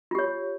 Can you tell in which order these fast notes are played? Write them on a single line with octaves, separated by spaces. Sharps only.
F4 G4 C#5